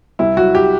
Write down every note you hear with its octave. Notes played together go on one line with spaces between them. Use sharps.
C2 E4
F#3 F#4
G4